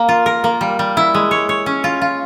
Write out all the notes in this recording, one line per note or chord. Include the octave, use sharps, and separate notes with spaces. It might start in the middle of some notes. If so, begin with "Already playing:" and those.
Already playing: A#3
F4
A#4
A#3
G3
G3
E4
G#3
C#5
C#5
C#4
F4
F4